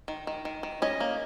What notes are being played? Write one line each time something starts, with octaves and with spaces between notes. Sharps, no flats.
D#3
D#3
D#3
D#3
C#4 D#5
A#3